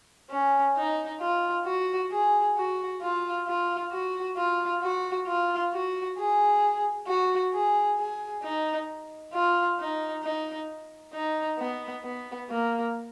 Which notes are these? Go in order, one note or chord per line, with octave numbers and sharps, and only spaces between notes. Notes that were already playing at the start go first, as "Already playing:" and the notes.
C#4
D#4
F4
F#4
G#4
F#4
F4
F4
F#4
F4
F#4
F4
F#4
G#4
F#4
G#4
G#4
D#4
F4
D#4
D#4
D#4
B3
B3
A#3